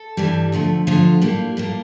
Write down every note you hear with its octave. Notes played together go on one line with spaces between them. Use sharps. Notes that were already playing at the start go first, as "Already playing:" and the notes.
Already playing: A4
G2 E3 G3
D2 D3 F3 A3
D2 D3 F3 A3 F4
A2 G3 A#3
A2 G3 A#3